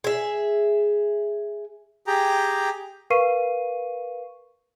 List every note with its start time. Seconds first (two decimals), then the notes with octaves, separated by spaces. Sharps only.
0.04 G#4 E5
2.07 G4 G#4 G5 A#5
3.10 A#4 B4 F5 C#6 C7 D#7